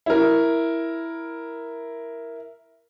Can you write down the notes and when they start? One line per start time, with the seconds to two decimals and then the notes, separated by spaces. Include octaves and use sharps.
0.06 E4 A#4